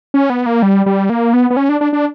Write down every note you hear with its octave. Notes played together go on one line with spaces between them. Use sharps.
C#4
B3
A#3
G3
G3
A#3
B3
B3
C#4
D4
D4
D4